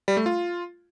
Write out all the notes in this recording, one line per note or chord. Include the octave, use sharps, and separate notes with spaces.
G3
A3
F4